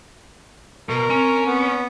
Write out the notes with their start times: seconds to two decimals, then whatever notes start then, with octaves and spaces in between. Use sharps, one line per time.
0.89 B2 A#4
1.10 C4 C#4
1.46 B3